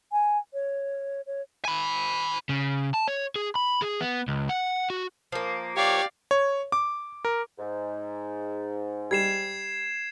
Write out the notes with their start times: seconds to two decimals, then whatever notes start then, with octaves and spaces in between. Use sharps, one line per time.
0.12 G#5
0.53 C#5
1.27 C#5
1.65 G#5 B5
2.49 C#3
2.94 A5
3.08 C#5
3.36 G#4
3.55 B5
3.82 G#4
4.01 B3
4.28 C#2
4.49 F#5
4.90 F#4
5.32 F3 A#3
5.76 G4 C#5 D5 F5
6.31 C#5
6.72 D6
7.25 A#4
7.59 G#2
9.11 G3 G#6 C7 E7